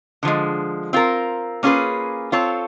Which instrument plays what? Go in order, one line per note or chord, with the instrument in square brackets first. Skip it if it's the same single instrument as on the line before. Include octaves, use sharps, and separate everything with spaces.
[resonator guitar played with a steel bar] D3 F3 G#3
C4 F4 A#4
A#3 C#4 F4 G#4 B4
C4 F4 A4 C#5